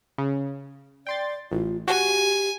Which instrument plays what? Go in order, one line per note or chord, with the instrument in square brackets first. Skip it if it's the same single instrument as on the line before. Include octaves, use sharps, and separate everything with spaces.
[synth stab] C#3
[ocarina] D5 [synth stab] G5 C6 A6
[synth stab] A1 [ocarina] F4
[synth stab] F#4 [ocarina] G4 [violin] G#5